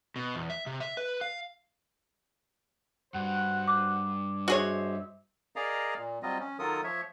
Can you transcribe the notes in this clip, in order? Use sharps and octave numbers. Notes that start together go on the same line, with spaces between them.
B2
E2
E5
C3
E5
B4
F5
G2 F#4 C5 F#5
D6
F#4 G#4 C5 C#5 D#5 E5
G#4 A#4 D5 D#5 F5 A#5
A#2
F#3 G3 C4 F4 D#5
C#4
D#3 F#3 F4 A4 A#4 D#6
F3 C#5 E5